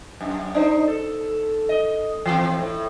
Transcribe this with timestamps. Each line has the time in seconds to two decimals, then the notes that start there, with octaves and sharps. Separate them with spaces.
0.21 F#2
0.54 D4 D#4 C5
0.88 A4
1.69 D#5
2.26 E3 F3 C4
2.59 A2